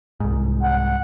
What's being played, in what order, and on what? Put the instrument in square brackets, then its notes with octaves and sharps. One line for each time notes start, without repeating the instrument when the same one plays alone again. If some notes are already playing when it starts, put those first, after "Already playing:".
[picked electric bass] C2 G#2
[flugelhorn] F#5